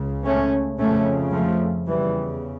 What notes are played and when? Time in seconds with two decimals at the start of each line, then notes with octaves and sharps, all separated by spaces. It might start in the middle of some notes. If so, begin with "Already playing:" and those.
Already playing: C#2 C#3
0.25 A3 C#4
0.79 F2 C#3 A3 C#4
1.33 F3 A3
1.88 E2 C#3 E3 G3